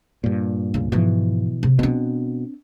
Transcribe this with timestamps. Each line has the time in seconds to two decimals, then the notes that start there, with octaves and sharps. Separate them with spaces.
0.24 G2 A#2
0.74 C#2 C#3
0.92 G#2 B2 E3 F3
1.63 C3
1.79 B2 C4 D4